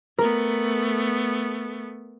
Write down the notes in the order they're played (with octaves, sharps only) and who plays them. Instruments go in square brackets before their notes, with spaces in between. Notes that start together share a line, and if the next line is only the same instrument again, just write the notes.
[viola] A3 B3 [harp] A#4